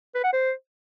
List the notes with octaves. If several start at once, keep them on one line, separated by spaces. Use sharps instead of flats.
B4
F#5
C5